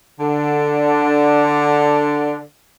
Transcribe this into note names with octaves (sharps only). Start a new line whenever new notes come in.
D3 D4